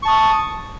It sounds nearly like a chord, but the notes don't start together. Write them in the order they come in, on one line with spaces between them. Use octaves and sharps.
C#6 A5 D#6